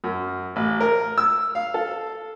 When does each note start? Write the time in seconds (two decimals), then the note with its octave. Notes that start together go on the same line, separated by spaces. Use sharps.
0.04 F#2
0.56 A1
0.80 A#4
1.18 E6
1.55 F5
1.74 A4